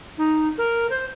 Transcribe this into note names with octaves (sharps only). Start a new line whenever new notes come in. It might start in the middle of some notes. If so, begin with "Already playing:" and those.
D#4
A#4
C5